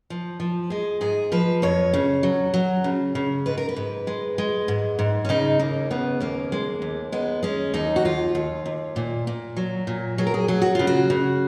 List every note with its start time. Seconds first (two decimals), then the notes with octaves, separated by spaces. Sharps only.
0.10 F3
0.40 F3
0.70 G#3 G#4
1.01 G#2 G#4
1.32 F3 B4
1.62 F2 C#5
1.94 C#3
2.23 F#3
2.54 F#3
2.84 C#3
3.15 C#3
3.46 G#2 B4
3.58 A#4
3.69 B4
3.76 G#2
4.07 G#3
4.38 G#3
4.68 G#2
4.99 G#2
5.25 C#4
5.29 C#3 D#4
5.59 D#2 A#3
5.91 C#3 B3
6.20 D#2 A#3
6.52 G#3
6.82 D#2
7.12 G#3 B3
7.43 G#3 C#4
7.74 D#2 D#4
7.96 F#4
8.05 D#2 F4
8.35 D#2
8.66 D#2
8.96 A#2
9.27 A#2
9.57 F#3
9.87 A#2
10.18 F#3 G#4
10.27 A#4
10.34 G#4
10.48 F#3 G#4
10.62 F#4
10.75 C#3 F4
10.87 F#4
11.10 C#3